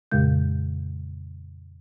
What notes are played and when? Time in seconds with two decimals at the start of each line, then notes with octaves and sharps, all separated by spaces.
0.12 F2 A#2 C#3 G#3 G6